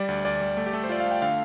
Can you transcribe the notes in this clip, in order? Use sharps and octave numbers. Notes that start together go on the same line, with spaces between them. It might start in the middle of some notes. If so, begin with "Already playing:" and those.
Already playing: G3 D5
D2
D2 D5
G3
A3
G4
A3 A4
C5
F4 D5
F5
A3
G5
D3 F5